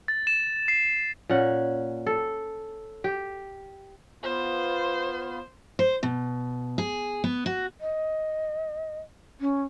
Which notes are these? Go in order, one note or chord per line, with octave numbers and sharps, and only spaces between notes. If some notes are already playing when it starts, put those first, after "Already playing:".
A6
E7
C7
A#2 C#4 F#5
A4
G4
B3 F4 C5
C5
B2
G#4
B3
F#4
D#5
C#4